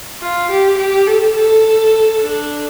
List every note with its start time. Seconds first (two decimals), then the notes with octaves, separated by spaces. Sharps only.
0.21 F4
0.50 G4
0.78 G4
1.07 A4
1.36 A4
2.22 D4